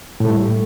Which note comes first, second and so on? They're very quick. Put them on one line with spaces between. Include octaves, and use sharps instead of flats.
A2 A3 G3